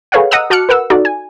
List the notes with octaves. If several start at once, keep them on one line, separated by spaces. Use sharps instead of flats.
G#4 A4 B4 C#5 F5 F#5
D#5 F#5 A#5 D#6 E6
F#4 A5 D6 F6 F#6 C#7
A#4 B4 F#5 E6
D#4 F#4 A4 D5
G#5